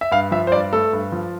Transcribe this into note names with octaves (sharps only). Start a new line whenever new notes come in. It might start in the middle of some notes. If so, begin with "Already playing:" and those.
E5
G2 F5
F3 E5
C5
G2 D5
A3 A4
G2
F3